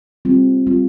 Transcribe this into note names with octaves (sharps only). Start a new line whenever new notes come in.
G3 C4 F4
G3 C4 F4